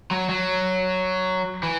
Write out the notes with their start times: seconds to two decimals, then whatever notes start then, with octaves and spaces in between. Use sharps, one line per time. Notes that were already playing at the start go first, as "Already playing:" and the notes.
0.11 F#3
0.29 F#3
1.63 E3